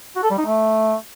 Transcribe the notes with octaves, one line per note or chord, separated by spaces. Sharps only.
F#4
A4
G3
D#4
A3